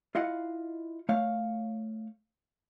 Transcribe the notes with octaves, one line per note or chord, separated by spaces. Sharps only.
E4 F4 D#5 F5 F#5
A3 C#5 F5